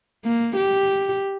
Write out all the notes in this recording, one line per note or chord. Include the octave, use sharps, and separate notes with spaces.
A#3
G4